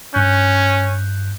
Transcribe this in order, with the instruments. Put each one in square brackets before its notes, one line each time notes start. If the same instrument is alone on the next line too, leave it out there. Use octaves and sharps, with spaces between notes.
[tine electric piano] G2 F#6 G6 [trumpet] C#4